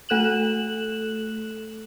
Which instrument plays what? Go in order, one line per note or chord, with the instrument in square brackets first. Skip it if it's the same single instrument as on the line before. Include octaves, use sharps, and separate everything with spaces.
[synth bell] A3 A4 F#6 E7 F#7